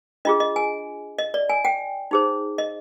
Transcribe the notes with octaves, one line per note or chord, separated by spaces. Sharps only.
D4 F4 G#4 D#5
D#5
G#5
D#5
D5
G#5
G5
D#4 G#4 C5
D#5